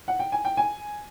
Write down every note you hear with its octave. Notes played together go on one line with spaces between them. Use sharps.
F#5
G5
G#5
G5
G#5